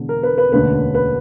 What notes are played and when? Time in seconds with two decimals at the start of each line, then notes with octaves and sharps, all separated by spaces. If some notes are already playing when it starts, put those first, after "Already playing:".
Already playing: E1 E2 D3
0.09 A#4
0.23 B4
0.38 B4
0.52 E1 D2 D3 A#3 C#4 B4
0.94 B4